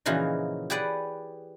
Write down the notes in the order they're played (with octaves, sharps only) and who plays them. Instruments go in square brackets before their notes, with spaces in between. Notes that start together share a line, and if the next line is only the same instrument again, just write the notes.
[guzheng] A#2 C#3 E3 F3 D#4 F#4
G4 G#4 B4 D5 F#5